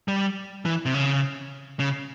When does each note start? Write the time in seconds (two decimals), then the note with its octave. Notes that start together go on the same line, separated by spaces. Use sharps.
0.08 G3
0.65 E3
0.85 C3
0.94 C#3
1.80 C#3